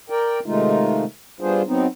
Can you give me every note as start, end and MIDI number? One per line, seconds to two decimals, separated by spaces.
0.10 0.40 70
0.10 0.40 74
0.10 0.40 79
0.46 1.04 48
0.46 1.04 51
0.46 1.04 56
0.46 1.04 57
0.46 1.04 63
0.46 1.04 65
1.40 1.62 55
1.40 1.62 59
1.40 1.62 62
1.40 1.62 65
1.40 1.62 68
1.40 1.62 72
1.67 1.87 54
1.67 1.87 59
1.67 1.87 60
1.67 1.87 63